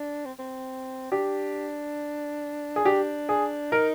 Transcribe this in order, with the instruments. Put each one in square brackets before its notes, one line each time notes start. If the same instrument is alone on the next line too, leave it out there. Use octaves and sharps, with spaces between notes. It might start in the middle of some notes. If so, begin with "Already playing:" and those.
Already playing: [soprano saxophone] D4
C4
C4
[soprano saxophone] D4 [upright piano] G4
[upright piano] G#4
[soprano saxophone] D4 [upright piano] G4
[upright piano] G#4
[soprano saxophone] D#4 [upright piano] A#4